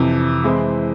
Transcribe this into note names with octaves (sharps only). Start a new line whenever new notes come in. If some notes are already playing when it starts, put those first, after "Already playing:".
Already playing: F2 C3 E3
E3 G#3 C4 E4